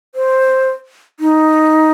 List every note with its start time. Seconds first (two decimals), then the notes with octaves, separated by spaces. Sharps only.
0.15 C5
1.20 D#4